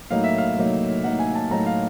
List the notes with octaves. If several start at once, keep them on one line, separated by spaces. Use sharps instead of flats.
A2 F#3 A#3 D#4 F5
E5
F5
A2 F#3 A#3 D#4
A2 F#3 A#3 D#4 F#5
G#5
A5
A2 F#3 A#3 D#4 A#5
F5